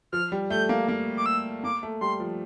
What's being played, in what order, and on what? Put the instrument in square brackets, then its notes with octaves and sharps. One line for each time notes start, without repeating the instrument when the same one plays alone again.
[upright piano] F3 [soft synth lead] F6
[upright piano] G3
[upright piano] A3 [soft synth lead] G6
[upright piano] A#3
A#3
[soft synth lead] D6
E6
[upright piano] A#3 [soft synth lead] D6
[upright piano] A3
[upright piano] G3 [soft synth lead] C6
[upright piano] F3